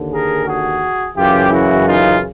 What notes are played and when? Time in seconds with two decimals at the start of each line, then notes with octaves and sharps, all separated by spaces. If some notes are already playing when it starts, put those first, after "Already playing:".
Already playing: D#2 D3
0.12 G#4 A#4
0.47 F#4 G#4
1.16 F#2 C#3 E3 F4 G4
1.51 E4 F#4
1.85 D#4 F4